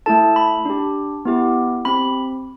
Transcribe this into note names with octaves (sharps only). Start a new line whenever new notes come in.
A3 E4 A4 A5
B5
D4 G4
B3 E4 G4
C4 G4 B5